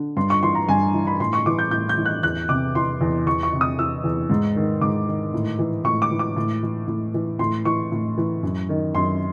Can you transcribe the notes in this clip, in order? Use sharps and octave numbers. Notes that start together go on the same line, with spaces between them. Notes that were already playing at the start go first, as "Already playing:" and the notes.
Already playing: D3
G2 C6
C#6
E3 C6
A#5
G2 G#5
E3
B5
A2 C6
C#6
E3 D6
G6
A2 G6
G6
E3
F#6
E2 F#6
C3 D6
E3 C6
E2
E2 C#6
C#6
C3
D#6
E3 E6
E2
G#2
D#3
G#2 D6
D#3
A2
E3
A2 C#6
D6
E3
D6
A2
E3
A2
E3
A2 C6
E3 C#6
A2
E3
F#2
D#3
F#2 C6